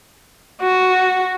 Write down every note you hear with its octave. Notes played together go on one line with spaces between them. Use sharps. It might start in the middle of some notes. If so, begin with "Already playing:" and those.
F#4